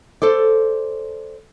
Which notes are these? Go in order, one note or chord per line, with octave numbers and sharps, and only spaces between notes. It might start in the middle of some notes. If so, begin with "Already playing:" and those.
A4 C5 D5